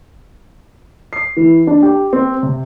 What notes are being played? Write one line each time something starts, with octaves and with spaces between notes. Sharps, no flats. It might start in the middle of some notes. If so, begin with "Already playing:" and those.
C7
E3
D4
G4
C4
C3